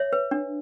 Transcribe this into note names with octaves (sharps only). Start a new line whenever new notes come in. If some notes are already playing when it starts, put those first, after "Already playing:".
Already playing: C#5 E5
B4
D4